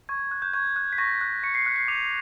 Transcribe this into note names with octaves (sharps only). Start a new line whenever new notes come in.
C#6 G#6
F#6
G6
C#6 G#6
F#6
B6
C#6 A#6
F#6
C#6 C#7
C7
F#6 B6
C7
D6 D#7 F7